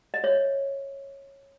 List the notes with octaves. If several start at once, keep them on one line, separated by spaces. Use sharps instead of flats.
D#5
C#5 E5